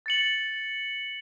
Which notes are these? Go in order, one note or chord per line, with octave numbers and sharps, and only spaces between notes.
A6 C#7 F#7